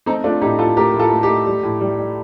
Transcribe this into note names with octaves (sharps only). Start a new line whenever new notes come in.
A3 C4 D#4
A3 D4 F4
A2 D#4 G4
A2 F4 A4
A3 G4 A#4
A2
F4 A4
A3
D#4 G4
A3
G3
A2
G3
G3